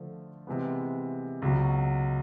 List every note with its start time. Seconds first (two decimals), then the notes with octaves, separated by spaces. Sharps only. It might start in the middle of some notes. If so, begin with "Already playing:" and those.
Already playing: D3 F3 A3
0.47 C3 E3 G#3 B3
1.42 C#2 B2 F#3